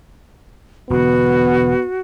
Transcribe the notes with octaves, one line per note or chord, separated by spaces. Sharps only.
E1 D3 B3 F#4